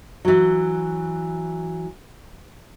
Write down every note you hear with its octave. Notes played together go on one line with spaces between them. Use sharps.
E3 F#3